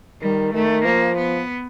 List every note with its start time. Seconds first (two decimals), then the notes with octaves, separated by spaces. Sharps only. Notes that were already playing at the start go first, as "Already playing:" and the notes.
0.22 D#3 G3
0.54 D#3 A3
0.85 F3 A#3
1.17 B3